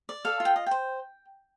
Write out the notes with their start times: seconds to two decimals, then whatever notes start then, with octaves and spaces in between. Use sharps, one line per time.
0.09 D5
0.25 A4 F5
0.40 F4
0.45 G5
0.56 D#5
0.66 C5 G5